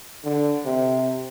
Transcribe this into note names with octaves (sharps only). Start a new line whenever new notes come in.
D3
C3